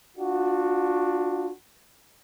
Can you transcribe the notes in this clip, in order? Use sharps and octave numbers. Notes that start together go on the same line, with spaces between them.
D4 F4 F#4